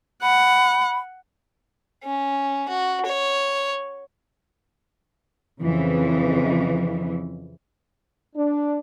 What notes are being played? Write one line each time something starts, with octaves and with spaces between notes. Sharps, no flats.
F#5 B5
C#4
F#4
C#5
F2 C#3 E3 F3
D4